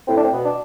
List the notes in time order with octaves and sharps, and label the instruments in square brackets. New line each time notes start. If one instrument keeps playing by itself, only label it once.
[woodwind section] A2 [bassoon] C4
[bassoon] D4
C4
[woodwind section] B2
[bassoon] D4